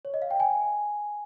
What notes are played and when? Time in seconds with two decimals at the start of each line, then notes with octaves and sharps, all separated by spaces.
0.05 C#5
0.14 D#5
0.22 F5
0.31 G5
0.40 G#5